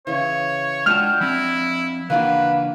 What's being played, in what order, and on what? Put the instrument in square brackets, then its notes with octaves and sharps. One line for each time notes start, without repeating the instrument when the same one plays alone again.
[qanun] C#3 E3 [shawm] C#5
[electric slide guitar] G#3 F4 A5 [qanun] D4 F#4 [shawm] G5 [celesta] F6 F7
[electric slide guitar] F3 C4 [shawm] E4
[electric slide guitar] C#3 E3 D4 [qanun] A#3 F4 F#4 [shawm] B4